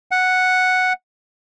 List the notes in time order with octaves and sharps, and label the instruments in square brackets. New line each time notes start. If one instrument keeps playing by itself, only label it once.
[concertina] F#5